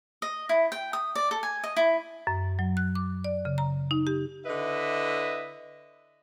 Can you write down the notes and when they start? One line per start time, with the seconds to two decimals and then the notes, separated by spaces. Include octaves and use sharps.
0.22 D#5
0.49 E4
0.72 G5
0.93 D#6
1.15 D5
1.31 A4
1.43 G#5
1.64 D#5
1.76 E4
2.27 F#2
2.59 F#3
2.77 F#6
2.95 D6
3.24 D5
3.45 C#3
3.58 A#5
3.91 D#4
4.07 G4
4.46 D3 E4 B4 D#5 E5